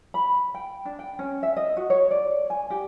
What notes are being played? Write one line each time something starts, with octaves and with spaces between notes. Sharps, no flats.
B5
G5
D4
G5
C#4
E5
D#5
F#4
C#5
D5
G#5
G4